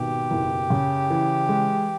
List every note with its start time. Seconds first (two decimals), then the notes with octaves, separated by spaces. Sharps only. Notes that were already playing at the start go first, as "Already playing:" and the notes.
Already playing: G#1 B2 G4
0.31 F#1
0.70 C#3
1.10 E3
1.49 G#3